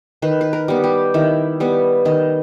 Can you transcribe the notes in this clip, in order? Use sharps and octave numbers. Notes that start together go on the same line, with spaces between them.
D#3 B4
B4
A#4
G3 B3
G4
D#3 E4
G3 B3
D#3 D#5